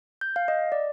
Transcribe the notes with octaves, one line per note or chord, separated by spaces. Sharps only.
G6
F5
D#5
D5